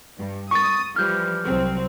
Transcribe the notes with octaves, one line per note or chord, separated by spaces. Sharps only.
G2
C#6 D#6 A6
E3 F3 G3 F6 G6
C2 F#3 C4